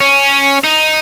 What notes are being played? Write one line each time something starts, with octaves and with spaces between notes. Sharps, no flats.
C#4
D#4